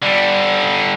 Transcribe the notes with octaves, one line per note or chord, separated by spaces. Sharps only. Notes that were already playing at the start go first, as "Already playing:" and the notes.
D3 G3